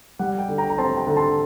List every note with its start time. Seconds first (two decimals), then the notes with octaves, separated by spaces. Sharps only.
0.19 G3 F#5
0.39 G5
0.48 D3
0.58 G5 A#5
0.70 A#5
0.78 C4 A5 C6
0.97 G5 A#5
1.07 D3
1.16 A5 C6